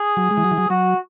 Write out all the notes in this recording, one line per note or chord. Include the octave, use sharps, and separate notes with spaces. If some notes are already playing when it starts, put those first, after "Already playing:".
Already playing: G#4
F#3
G#3
E3
F#3
E3
F#3
F#3 F#4